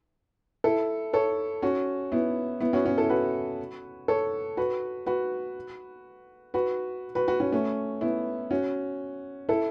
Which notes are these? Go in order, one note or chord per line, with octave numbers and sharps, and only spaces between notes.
E4 A4
A4 C#5
C#4 F#4
B3 E4
B3 E4
C#4 F#4
C#4 F#4
E4 A4
F#4 B4
A4 C#5
F#4 B4
F#4 B4
F#4 B4
F#4 B4
F#4 B4
C#4 F#4
A3 C#4
B3 E4
C#4 F#4
E4 A4